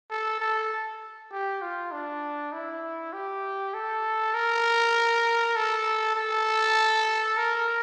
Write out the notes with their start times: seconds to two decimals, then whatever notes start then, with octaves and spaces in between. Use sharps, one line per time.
0.11 A4
0.40 A4
1.32 G4
1.62 F4
1.92 D4
2.53 E4
3.13 G4
3.74 A4
4.34 A#4
5.56 A4
6.16 A4
7.37 A#4